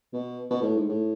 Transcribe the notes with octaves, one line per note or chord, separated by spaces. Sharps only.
B2
B2
A2
G#2
A2